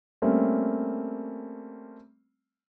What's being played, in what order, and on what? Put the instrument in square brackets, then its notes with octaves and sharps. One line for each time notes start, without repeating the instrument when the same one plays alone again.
[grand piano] G3 A3 A#3 C4 C#4